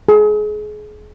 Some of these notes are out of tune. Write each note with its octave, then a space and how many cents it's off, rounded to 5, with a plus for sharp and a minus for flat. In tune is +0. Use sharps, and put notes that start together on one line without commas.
G#4 +30